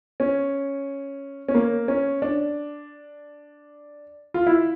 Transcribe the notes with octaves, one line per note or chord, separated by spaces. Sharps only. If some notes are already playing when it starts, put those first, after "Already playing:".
C#4
C#4
A#3
C#4
D4
F4
E4